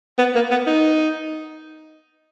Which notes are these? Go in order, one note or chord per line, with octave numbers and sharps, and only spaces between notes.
B3
A#3
B3
D#4